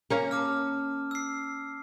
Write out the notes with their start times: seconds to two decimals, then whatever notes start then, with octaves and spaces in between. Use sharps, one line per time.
0.10 A#3 C#4 A#4
0.31 A5 D6 F6
1.11 E6 C7